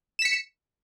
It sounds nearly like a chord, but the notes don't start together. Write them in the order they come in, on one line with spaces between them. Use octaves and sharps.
E7 B6 C#7